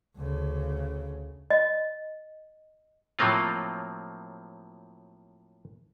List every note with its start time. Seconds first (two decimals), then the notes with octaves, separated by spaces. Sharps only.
0.17 D2 C#3
1.50 D#5
3.19 A2 F3 F#3 A#3 C4 F4